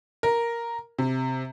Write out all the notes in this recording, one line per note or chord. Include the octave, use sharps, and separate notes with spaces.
A#4
C3